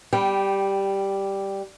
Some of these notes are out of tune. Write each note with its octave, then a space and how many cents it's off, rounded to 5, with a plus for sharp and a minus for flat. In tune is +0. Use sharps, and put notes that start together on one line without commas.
G3 +0 G5 -15